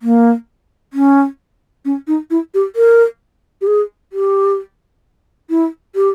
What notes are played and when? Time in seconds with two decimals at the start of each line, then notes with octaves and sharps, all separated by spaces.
0.02 A#3
0.93 C#4
1.85 C#4
2.07 D#4
2.30 E4
2.54 G4
2.76 A#4
3.61 G4
3.67 G#4
4.13 G4
5.50 E4
5.95 G4